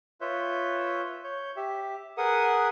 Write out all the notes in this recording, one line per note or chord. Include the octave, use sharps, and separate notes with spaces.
F4 B4 C#5 E5 G6
C#5 G6
G4 E5
G#4 A#4 B4 F#5 D#6